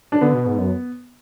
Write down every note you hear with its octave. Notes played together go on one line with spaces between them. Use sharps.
D4
D3 B3
B2
G#2
F#2